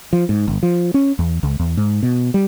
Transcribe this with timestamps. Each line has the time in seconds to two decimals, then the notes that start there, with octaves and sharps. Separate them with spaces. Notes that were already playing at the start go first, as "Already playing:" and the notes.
0.13 F3
0.29 G#2
0.48 G1
0.63 F3
0.94 C#4
1.19 E2
1.43 C#2
1.59 E2
1.77 G#2
2.03 B2
2.34 G3